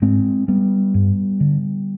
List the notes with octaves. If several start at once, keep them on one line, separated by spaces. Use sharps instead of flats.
G#2 G#3 C4
G3 B3
G2
D3